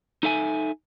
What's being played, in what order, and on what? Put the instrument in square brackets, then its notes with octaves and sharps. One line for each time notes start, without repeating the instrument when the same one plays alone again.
[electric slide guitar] D#4 A4 E5 G#5